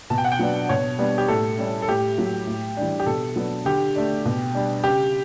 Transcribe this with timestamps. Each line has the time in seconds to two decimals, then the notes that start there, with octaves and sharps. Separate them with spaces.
0.10 B2 A5
0.18 G5
0.25 F#5
0.32 G5
0.39 F#3 B3 D4
0.69 B2 C#5
0.99 G3 B3 D4
1.18 G4
1.28 A2 A4
1.58 G3 C#4
1.82 A4
1.87 A2 G4
2.18 F#3 A3
2.47 A2
2.77 E3 G3 D4
3.00 G4
3.06 B2 A4
3.36 F#3 B3 D4
3.65 D3 G4
3.96 A3 D4
4.25 B2
4.55 G3 D4
4.84 C#3 G4